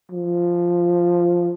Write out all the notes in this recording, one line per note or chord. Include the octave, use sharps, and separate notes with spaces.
F3